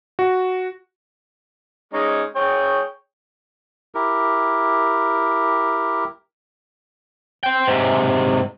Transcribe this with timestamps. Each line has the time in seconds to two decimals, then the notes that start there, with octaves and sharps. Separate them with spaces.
0.19 F#4
1.94 G#3 C#4 D#4
2.36 G#4 C#5 G5
3.95 E4 G4 A#4
7.43 C5 G5
7.67 G#2 C3